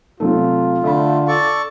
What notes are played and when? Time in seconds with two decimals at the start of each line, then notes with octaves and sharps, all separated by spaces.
0.20 C3 F#3 A3 F4
0.84 D3 A3 E5 A5 B5
1.28 A4 D5 C#6